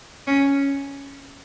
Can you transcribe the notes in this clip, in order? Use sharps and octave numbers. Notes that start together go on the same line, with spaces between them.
C#4